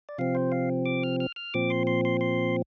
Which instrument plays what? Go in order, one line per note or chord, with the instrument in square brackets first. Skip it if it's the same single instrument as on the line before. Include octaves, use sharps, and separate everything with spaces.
[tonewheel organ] D5
C3 F3 C4 F5
C5
F5
D6
F6
F6
F6
A#2 F3 C4 D6
C6
C6
C6
C6